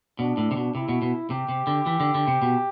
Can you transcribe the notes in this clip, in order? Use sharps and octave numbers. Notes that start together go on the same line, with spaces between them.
B2 D4
A2
C3
B2
C3 E4
B2
B2
C3 G4
C3
D3
E3
D3
D3
C3
B2